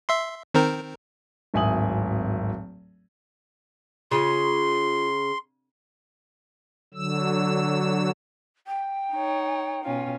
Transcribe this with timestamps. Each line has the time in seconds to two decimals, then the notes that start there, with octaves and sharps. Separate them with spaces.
0.09 E5 C6
0.54 D#3 C4 A#4
1.54 D1 G#1 E5 G#5 D#6 F#7
4.11 C#3 F4 C6
6.94 D3 F#3 E6
8.67 G5
9.13 D#4 C#5
9.84 B2 C#4 F4